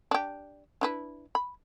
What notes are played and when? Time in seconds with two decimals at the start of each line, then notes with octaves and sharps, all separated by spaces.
0.11 D4 G4
0.81 D4 E4 B4
1.35 B5